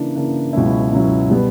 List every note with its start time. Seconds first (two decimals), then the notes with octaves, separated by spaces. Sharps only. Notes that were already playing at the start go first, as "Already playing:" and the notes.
Already playing: C#3 E3 A#3 D4
0.15 C#3 E3 A#3 D4
0.53 C#2 B2 F#3 C#4 E4
0.92 C#2 B2 F#3 C#4 E4
1.30 B2 G3 B3